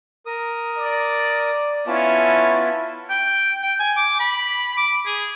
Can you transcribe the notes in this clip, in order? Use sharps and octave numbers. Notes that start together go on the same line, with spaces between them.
A#4 D#6
D5
B3 C#4 E4 F4 A5
G5
G5
G#5
D6
B5
D6
G#4